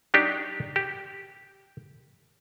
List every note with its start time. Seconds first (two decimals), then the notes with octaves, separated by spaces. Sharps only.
0.14 F#3 D4 D#4 G4
0.76 G4